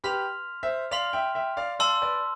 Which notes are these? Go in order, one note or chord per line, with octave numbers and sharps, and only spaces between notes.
G4 B4 C6 F6 B6 F7
C5 E5
D5 F5 C6 F6 B6 F7
E5 G5
E5 G5
D5 F5
D5 F5 A5 C6 E6
B4 D5